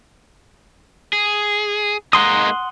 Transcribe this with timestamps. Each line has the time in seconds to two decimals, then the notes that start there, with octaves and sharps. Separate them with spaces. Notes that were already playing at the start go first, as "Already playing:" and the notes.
1.13 G#4
2.13 G#3 A#3 D#4 F#5 C6 D#6